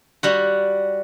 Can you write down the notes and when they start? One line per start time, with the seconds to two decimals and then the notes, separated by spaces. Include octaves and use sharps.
0.23 G3 F#4